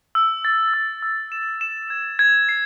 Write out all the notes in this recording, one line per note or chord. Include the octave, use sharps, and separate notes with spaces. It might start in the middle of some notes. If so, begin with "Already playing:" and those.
E6
A6
E6
E6
E7
E7
G#6
G#6
C7